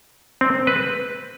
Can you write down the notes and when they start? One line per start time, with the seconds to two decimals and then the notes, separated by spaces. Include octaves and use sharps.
0.41 C4
0.67 B4